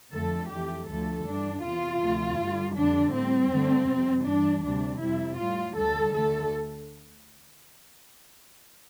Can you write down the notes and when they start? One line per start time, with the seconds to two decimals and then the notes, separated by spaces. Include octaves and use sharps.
0.13 F2 D3 F3 A3 A4
0.50 F2 E3 A3 G4
0.87 D2 D3 F3 A3 A4
1.25 G2 E3 G3 D4
1.63 E2 C3 E3 F4
2.01 D2 C3 F3 A3
2.38 G2 D3 G3
2.75 F2 D3 G3 D4
3.12 A2 G3 C4
3.50 G2 D3 A3
3.87 F2 C3 G3
4.25 G2 E3 G3 D4
4.63 D2 C3 G3 D4
5.00 F2 C3 G3 E4
5.38 A2 G3 F4
5.75 D2 D3 G3 A4
6.13 D2 D3 A3 A4